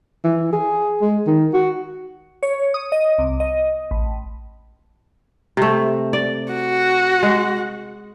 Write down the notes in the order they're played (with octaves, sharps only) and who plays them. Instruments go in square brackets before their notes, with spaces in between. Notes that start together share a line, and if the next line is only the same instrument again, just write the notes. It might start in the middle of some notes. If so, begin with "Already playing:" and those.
[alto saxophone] E3
G#4
G#3
D#3
F#4
[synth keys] C#5
D#6
D#5
C2
D#5
A1
[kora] C3 A3
D5
[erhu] F#4
[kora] G#3